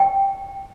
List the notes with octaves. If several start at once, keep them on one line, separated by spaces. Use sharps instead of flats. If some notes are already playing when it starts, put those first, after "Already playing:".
Already playing: G5